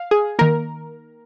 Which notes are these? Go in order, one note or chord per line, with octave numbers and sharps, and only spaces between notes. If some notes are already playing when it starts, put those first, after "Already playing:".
Already playing: F5
G#4
D#3 A#3 A#4